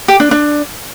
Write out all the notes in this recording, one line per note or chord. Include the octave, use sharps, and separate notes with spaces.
G4
D4
D4